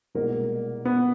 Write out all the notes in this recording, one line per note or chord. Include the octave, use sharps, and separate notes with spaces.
C2 B2 G#3 A#3
B3